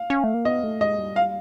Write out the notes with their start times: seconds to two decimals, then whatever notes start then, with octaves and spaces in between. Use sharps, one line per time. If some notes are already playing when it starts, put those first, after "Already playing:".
Already playing: F5
0.10 C#4
0.24 A3
0.34 A#3
0.45 B3 D#5
0.64 A3
0.81 G#3 D#5
0.99 G3
1.16 F5